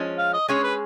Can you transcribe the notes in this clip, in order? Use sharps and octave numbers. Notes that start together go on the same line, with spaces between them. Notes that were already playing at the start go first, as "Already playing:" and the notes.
Already playing: F3 G#3 C#4
F5
D#5
G#3 C#4 G#4 C#5
B4